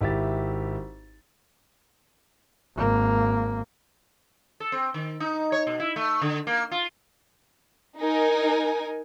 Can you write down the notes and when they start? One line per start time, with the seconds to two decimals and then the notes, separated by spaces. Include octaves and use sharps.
0.01 G#1 E4 G4 E5 A6
2.76 G#1 A#3
4.60 A4
4.72 C4
4.94 D#3
5.20 D#4
5.52 C#5
5.67 B2
5.80 E4
5.96 A3
6.21 D3
6.47 A#3
6.71 F4
8.00 D#4 A#4 G#5